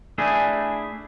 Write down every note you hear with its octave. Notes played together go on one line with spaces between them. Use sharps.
A3 D4 E4 G#4